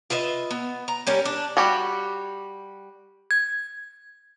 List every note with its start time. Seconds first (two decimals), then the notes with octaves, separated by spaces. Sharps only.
0.10 F4 B4 D#5 E5
0.51 B3
0.88 A#5
1.07 G3 C#4 G4 A#4
1.25 D4
1.57 G3 F#4 G4
3.31 G#6